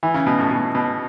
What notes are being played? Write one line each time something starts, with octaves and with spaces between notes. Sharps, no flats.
E3
C#3
B2
A2
B2
B2